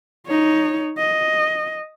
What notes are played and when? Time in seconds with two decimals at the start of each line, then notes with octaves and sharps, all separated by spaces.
0.27 D#4 C#5
0.98 D#5